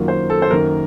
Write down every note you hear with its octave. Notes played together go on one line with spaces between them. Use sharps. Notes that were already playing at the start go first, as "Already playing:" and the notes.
Already playing: F#2 D#3 F#3 A#3 F4
C5
A4
C5
F#2 D#3 A#3 A#4